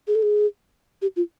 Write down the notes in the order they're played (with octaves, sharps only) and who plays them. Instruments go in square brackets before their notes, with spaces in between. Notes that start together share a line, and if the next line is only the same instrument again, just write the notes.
[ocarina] G#4
A4
G#4
G4
F4